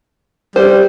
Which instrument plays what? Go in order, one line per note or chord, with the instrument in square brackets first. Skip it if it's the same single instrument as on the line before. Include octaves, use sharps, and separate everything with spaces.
[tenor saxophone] G3 [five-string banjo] C5